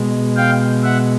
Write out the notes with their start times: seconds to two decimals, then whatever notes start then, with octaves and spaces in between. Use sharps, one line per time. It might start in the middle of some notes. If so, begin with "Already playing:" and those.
Already playing: B2 G#3
0.36 F5 G5
0.83 E5 F#5